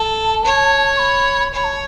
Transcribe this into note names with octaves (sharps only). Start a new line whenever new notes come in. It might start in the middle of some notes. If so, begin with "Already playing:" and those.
Already playing: A4 A5
C#5
C#6
B5
C#5 B5
A5